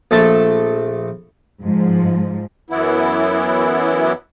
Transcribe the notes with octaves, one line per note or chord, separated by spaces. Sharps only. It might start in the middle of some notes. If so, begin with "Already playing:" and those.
A#1 A3 A4 A5
G#2 F3
F#2 E3 B3 E4